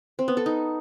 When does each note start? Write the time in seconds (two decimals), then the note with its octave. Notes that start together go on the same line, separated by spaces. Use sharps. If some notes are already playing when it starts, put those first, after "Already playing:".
0.19 C4
0.28 B3
0.37 A4
0.46 D#4